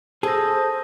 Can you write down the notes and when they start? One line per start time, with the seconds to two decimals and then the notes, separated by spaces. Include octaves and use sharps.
0.23 G#4 A4 C5 E6 A#6